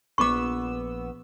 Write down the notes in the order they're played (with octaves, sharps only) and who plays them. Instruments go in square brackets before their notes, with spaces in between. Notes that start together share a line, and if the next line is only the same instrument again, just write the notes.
[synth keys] A#1 B3 E6 [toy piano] C#6 D6